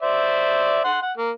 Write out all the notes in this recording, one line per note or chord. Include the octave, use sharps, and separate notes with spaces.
C5 D5 E5
F#5 C6
F#5
A#3